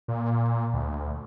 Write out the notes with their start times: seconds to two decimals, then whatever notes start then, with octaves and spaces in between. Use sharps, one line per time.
0.08 A#2
0.74 D2